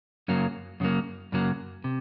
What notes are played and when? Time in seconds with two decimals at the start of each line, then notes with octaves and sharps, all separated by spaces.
0.28 F#2 C#3 F#3 A#3
0.80 F#2 C#3 F#3 A#3
1.32 F#2 C#3 F#3 A#3
1.84 C3